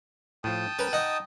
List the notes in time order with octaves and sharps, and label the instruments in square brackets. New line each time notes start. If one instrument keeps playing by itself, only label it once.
[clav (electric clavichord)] A2 F3 [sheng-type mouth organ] G5 A5 D#6
[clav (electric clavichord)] C#4 A#4 [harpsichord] B4
[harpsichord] D#4 [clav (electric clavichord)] F#5